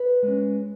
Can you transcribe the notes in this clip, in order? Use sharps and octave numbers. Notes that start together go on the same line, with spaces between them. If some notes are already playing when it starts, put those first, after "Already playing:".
Already playing: B4
G#3 C#4